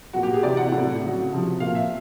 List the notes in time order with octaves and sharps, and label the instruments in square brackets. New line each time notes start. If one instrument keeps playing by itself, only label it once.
[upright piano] A#2 F#3 F#4
G4
G#4
C3 E3 D5
F#5
A2 F#3
C#3 F#3
C3 F3
A#2 F3 F5
E5